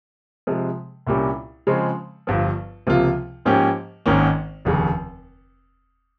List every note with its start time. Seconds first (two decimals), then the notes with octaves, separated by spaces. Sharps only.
0.47 C3 F3 G#3
1.07 C2 A#2 G3 C#4
1.67 C#3 F3 G#3 C4
2.27 G1 G2 F3
2.87 C#2 C3 F3 A#3 F4
3.45 G#2 F3 A#3 C#4 G4
4.06 G#1 G#2 D#3 A#3 C#4
4.65 F1 D#2 C#3